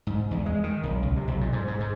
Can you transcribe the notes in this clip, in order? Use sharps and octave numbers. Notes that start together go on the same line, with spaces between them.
G#2
E2
G#3
D#3
B1
C#2
C3
B1
A#2
G#2
G#2
G#2